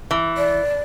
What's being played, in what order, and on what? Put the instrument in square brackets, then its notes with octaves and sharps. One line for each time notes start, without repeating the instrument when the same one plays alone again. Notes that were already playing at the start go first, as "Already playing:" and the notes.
[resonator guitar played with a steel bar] E3
[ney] D5